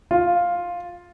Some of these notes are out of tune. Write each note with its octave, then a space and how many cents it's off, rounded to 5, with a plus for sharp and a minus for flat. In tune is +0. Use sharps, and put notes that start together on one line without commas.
F4 +5